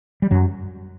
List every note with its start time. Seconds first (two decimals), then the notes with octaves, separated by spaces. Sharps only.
0.22 G3
0.31 F#2 F#3